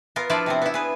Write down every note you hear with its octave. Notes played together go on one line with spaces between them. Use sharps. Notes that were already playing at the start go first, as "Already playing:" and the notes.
B3 F4 A#4
F3 D4 E4 F4 B4 D5
C3 B3 C4
B3 E4
G#4 B4